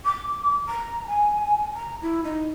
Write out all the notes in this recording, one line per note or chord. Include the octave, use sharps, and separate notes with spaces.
D6
A#5
G#5
A#5
E4
D#4